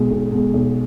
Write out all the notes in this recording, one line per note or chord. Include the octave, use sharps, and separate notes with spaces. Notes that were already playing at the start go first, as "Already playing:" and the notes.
Already playing: B1 B2 G#3
B1
B2 G#3
B1